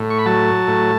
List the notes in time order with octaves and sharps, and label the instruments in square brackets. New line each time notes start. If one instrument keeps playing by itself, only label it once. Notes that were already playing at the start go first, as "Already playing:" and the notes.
Already playing: [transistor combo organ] A2
C#6
B5
F#3 A5
A2